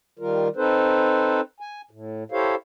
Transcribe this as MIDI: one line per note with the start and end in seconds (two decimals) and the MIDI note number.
0.19 0.48 51
0.19 0.48 55
0.19 0.48 65
0.19 0.48 70
0.56 1.41 60
0.56 1.41 63
0.56 1.41 69
0.56 1.41 71
0.56 1.41 72
1.60 1.81 80
1.91 2.24 45
2.32 2.55 64
2.32 2.55 67
2.32 2.55 69
2.32 2.55 72
2.32 2.55 73
2.32 2.55 77